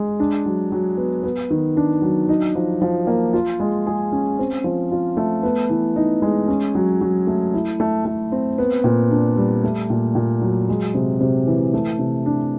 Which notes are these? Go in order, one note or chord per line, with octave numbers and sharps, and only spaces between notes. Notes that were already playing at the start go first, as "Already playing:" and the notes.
Already playing: G#3
D4
F#3
F#3
B3
B3
D#3
D4
F#3
D#4
F3
F3
A#3
F4
G#3
G#4
C#4
C4
F3
F4
A3
B3
E3
D#4
G#3
C#4
F#3
F#3
A3
E4
A3
A3
C4
B3
A#2
D4
G3
A3
A#2
A#2
F#3
G#3
C3
C3
E3
A3
C3
D4